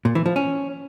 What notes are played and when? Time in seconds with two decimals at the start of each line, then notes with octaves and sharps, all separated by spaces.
0.05 A#2
0.15 E3
0.26 F3
0.36 C#4